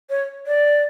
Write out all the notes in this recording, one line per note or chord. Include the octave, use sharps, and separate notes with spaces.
C#5
D5